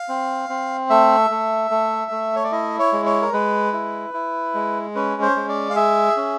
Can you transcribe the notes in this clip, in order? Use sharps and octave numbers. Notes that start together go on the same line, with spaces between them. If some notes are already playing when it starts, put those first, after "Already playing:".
Already playing: F5
C4
C4
A3 E5
A3
A3
A3
C#5
D5
E4 D#5
C#5
G#3
C#5
A#4
G#3 B4
E4
E4
G#3
C#4 B4
C5
G#3
D5
F5
G#4 E5
C#4